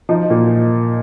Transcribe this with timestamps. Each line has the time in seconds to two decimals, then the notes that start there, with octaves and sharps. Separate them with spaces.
0.09 F3 D#4
0.30 A#2